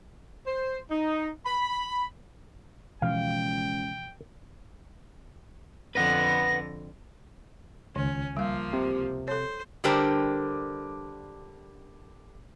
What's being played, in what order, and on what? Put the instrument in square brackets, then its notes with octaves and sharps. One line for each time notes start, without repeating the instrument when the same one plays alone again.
[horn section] C5
D#4
B5
[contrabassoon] C#2 [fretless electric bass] B2 E3 F3 [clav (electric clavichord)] F5 [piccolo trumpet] G5
[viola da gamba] F2 D3 [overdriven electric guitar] B4 F#5 [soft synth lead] A#6
[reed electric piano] C#2 [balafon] D#3 [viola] C#4
[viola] F3 A#3 [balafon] G3 F5
[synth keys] C3
[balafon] A4 C#5 [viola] C5
[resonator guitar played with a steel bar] D3 G3 D4 G4 A#4 C5